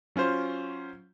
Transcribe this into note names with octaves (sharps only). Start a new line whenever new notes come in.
F#3 C#4 F4 C5